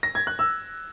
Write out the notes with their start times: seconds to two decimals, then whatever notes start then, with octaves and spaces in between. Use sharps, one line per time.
0.03 A#6
0.15 G#6
0.27 F#6
0.39 E6